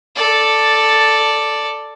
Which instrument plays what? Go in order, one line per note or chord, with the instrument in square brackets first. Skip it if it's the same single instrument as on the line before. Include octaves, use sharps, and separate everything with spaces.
[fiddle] A4 D5